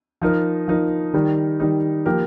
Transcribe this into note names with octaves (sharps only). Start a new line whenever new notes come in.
F3 D#4 A#4
F3 D#4 A#4
D#3 G3 D#4
D#3 G3 D#4
F3 A#3 G4 A#4